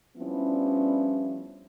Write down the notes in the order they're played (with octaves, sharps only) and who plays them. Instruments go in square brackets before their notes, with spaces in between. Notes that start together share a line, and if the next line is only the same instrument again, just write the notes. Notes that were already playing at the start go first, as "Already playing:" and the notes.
[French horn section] F3 G3 B3 C#4 D4 E4